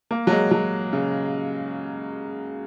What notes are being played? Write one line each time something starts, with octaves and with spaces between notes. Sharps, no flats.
A#3
F#3
G#3
F#3
C#3